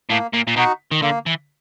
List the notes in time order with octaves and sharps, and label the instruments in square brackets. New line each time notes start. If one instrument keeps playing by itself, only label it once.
[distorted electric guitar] A2 [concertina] A#3
[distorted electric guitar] A#2
A#2
[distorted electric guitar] B2 [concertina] D#4 F#4
[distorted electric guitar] D#3
[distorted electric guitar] D3 [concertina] A#3
[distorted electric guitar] E3